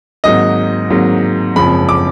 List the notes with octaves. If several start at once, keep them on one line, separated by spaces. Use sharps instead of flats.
G#1 G#2 F#3 A#3 D#5
G#1 G#2 F#3 A#3
F#1 F2 F3 G#3 B5
D6